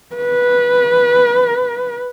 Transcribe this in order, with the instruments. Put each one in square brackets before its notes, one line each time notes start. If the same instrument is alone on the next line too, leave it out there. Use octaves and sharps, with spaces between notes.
[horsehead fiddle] B4